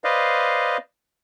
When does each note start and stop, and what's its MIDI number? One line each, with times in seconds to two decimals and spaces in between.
0.04 0.77 71
0.04 0.77 72
0.04 0.77 74
0.04 0.77 75
0.04 0.77 77